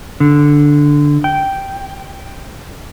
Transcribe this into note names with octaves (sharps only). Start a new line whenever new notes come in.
D3
G5